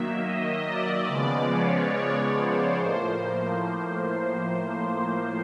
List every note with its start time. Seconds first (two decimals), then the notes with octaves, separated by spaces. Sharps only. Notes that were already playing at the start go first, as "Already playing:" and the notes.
Already playing: D#3 F#3 A#3 E5
0.22 D#5
0.65 D5
1.08 C#3 F3 G#3 B3
1.50 C#5
2.34 C5
2.77 A2 F3 A#3